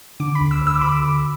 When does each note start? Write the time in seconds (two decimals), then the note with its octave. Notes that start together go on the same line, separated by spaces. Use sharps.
0.20 D3 D6
0.35 B5
0.41 D2
0.51 E6
0.62 D2
0.67 E6
0.74 D6
0.81 D2 B5
0.89 D6
1.03 D2